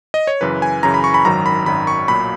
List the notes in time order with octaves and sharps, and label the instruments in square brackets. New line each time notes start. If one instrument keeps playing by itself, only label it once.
[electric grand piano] D#5
C#5
F#2 C#3 E3 B4
G#5
F#2 C#3 E3 A#5
B5
C#6
B5
G#1 F#2 D#3 F#3 A#5
B5
G#1 F#2 D#3 F#3 B5
C#6
B1 A#2 F#3 B5